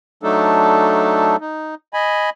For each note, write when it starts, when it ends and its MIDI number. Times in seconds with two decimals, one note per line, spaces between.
0.23 1.36 54
0.23 1.36 57
0.23 1.36 62
0.23 1.36 63
0.23 1.36 69
1.41 1.75 63
1.94 2.30 75
1.94 2.30 80
1.94 2.30 83